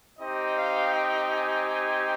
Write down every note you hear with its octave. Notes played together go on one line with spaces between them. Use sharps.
C4 D#4 G4 D#5
F5
G5
G#5
G#5